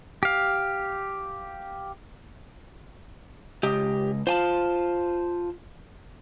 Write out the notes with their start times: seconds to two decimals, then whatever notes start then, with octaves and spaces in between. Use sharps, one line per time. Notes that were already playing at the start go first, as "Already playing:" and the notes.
0.23 G4 F5
3.63 C#2 G4 D#5
4.27 F4 C5 G#5 A5